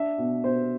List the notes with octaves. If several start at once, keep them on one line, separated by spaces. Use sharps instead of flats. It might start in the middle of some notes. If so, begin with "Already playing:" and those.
Already playing: D4 E5
B2
B2 C5